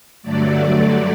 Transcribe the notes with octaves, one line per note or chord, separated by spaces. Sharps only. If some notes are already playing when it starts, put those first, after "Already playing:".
G2 D3 F#3 A3 D5